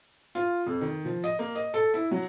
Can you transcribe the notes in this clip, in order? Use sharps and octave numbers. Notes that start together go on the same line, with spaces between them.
F4
F2
D#3
F3
D#5
A#3
D#5
A4
E4
F#3